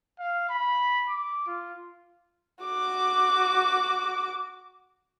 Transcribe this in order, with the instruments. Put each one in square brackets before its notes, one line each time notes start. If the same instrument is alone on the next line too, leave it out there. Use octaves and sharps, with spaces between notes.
[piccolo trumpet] F5
B5
D6
F4
[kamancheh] F#4 D6